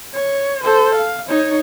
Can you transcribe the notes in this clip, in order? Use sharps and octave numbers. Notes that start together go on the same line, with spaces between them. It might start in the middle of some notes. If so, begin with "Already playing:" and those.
C#5
A4 C5
F5
D#4 C#5